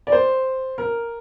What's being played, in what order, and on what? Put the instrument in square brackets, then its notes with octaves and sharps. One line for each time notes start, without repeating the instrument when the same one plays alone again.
[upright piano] D5
C5
A#4